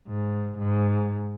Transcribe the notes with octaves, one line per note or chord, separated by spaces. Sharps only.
G#2
G#2